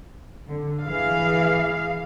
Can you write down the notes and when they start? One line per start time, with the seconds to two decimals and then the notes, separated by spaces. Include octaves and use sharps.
0.49 D3
0.85 E3 G#4 F5